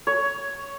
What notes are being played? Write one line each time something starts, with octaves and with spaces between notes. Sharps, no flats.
C#5